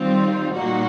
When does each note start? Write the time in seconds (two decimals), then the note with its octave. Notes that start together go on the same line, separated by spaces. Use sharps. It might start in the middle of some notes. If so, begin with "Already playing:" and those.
Already playing: D#3 G3 C4 F4
0.53 A#2 G3 A#3 D#4 F#4